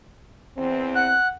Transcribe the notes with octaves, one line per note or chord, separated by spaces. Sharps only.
E2 E3 C4
F#5 F#6